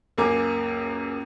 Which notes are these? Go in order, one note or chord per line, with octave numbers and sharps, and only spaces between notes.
C#2 F#2 A#3 G#5 D6